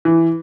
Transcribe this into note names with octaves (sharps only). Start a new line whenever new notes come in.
E3